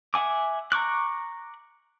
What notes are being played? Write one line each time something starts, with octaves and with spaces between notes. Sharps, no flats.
E5 F#5 G#5 D6
A#5 C#6 D6 F#6